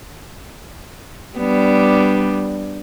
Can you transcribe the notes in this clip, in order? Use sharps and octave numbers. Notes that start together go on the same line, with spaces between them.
G3 B3 D4